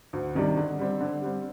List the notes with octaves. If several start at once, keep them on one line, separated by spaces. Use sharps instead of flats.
D2
C3 D#3 G3 D4
D3
G3 C4
D3
G3 C4